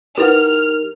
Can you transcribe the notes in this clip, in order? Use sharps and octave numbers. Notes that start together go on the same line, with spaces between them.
D#4 E4 G4 A#4 B4 F#5 F6